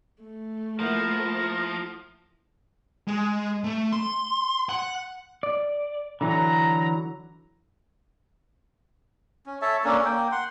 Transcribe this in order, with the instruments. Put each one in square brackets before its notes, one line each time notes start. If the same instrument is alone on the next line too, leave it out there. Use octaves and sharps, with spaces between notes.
[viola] A3
[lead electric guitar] F3 [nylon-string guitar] A#3 B3 E4 [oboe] A#4
[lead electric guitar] G#3
A3
C6
F#5
[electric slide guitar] D5
[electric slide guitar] D3 E3 F#3 [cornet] A#5
[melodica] C#4
A4 C#5 E5 A5
A#3 C#4 D4 A4
A#3 G5
F#5 C6